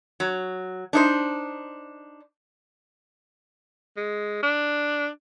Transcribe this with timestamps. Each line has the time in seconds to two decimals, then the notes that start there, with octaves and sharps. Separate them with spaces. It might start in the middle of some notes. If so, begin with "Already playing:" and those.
0.20 F#3
0.93 D4 D#4 C5
3.97 G#3
4.43 D4